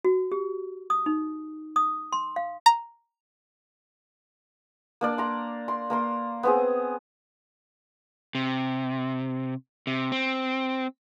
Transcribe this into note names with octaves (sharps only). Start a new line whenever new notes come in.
F#4
G4
D#6
D#4
D#6
C6
F5
A#5
A#3 D4 D5
A#5 C6
C6
A#3 A#5 C6
B3 C4 G#4
C3
C3
C4